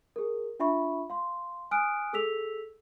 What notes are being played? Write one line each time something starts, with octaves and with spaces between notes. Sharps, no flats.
G#4 A#4
D4 F4 E5 B5 C#6
F5 C6
G#5 D#6 F6 F#6 D7
G#4 A4 E6 B6 F7